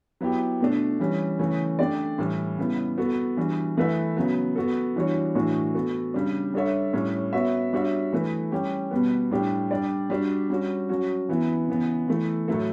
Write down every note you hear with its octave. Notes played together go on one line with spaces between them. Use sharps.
F#3 B3 E4 G4
B2 A3 D4
E3 G3 C#4
C#3 E3 A3 C#4
A3 D4 G4 D5
A2 E3 G3
C#3 G3 B3 E4
B3 F#4 A4
E3 G3 D4 F#4
E3 A3 E4 B4 E5
C#3 F#3 B3
B3 F#4 A4
E3 G3 D4 F#4 C#5
A2 E3 A3 D4 F#4
B3 F#4 A4
C#3 G3 D4
G3 D4 A4 C#5 E5
A2 G3 C#4
B3 F#4 C#5 E5
G3 D4 F#4 C#5 E5
E3 A3 E4 B4
G3 C#4 G4
B2 G3 B3
A2 G3 D4 G4
G3 D4 G4 D5
G3 D4 F#4
G3 C#4 F#4
F#3 C#4 F#4
E3 B3 E4
C#3 E3 B3
E3 A3 E4
A2 F#3 A3 E4 A4